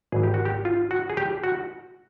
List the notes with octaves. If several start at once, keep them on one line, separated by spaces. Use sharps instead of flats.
G#1 G#2 E3 G#4
G4
F#4
G4
F4
F#4
G#4
G4
F#4